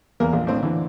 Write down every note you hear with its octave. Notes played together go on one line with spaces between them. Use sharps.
E2 A#3 A#4
A#1
A2 C4 D4
D3 E3